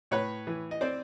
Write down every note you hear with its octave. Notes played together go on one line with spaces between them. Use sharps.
A2 B4 C#5
E3
D#5
C4 C5 D5